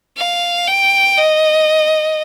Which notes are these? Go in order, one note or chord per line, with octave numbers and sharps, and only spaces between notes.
F5
G5
D#5